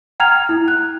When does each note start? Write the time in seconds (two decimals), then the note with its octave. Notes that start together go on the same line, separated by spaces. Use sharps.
0.20 F#5 G5 A#5 F6 G#6 F7
0.49 E4
0.68 F#6